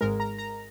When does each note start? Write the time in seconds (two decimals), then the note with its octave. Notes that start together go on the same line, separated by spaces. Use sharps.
0.01 G#1 G#2 G#3 A#4
0.20 A#5
0.38 A#5